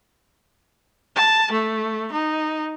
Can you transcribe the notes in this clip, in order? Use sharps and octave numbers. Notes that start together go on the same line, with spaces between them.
A5
A3
D#4